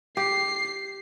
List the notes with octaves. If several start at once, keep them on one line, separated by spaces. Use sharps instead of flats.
G4 C7